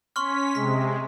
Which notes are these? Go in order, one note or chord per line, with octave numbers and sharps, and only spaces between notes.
C#4 C6 C#6 F6 B6
C3 G#3 B6